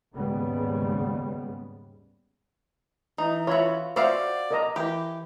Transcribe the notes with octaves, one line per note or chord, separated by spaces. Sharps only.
D#2 G#2 C#3 G3 G#3 B3
E3 D#4
F4 F#4 C#5 E5 B5
F#4 C5 D5 E5 F5
A#4 D#5 A#5
E3 G4